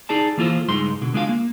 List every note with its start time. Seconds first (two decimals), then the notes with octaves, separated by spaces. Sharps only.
0.09 D#4 G#4 D5 A5
0.38 E3 A#3 F4 A4 C5
0.69 C#2 G2 G#3 D#4 C6
1.02 B2 D3
1.13 C#2 G#3 D4 F4 F5
1.29 A#3